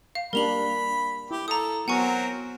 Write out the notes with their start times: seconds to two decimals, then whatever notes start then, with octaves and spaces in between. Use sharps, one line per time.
0.15 F5
0.33 G3 A#3 D4 A#4 B5 F7 F#7
1.31 E4 G4
1.48 A4 A#5 D#6
1.88 F#3 B3 C4 A#4 F#5 G#5 C#6